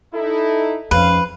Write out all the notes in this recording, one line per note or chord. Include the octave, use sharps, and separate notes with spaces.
D#4 E4 A4
F2 G#2 C4 C#4 B4 F5